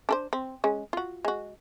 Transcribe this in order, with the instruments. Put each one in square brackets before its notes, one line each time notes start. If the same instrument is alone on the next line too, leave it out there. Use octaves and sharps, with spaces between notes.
[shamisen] D4 A4 C5
C4
G#3 C#4
F4 F#4
G#3 F#4